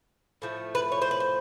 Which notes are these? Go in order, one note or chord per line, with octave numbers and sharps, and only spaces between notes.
A2 F3 A3
B4
C#5
C5
B4
C5